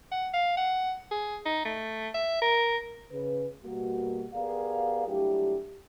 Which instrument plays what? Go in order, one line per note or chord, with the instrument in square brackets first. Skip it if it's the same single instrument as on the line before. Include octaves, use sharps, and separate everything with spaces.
[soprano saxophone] F#5
F5
F#5
G#4
D#4
A3
E5
A#4
[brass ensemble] C#3 B4
B2 G3 A#3 F#4
B3 G4 G#4 A#4 D5 F5
F#3 G3 A3 D4 E4 G4